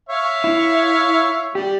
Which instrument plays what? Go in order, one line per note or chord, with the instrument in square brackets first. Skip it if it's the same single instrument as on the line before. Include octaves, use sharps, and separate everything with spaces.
[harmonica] C#5 E5 F5
[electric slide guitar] E4
[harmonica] G3 [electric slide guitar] G4